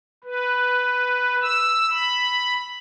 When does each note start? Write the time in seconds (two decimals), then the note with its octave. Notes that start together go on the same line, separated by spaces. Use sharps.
0.24 B4
1.42 E6
1.91 B5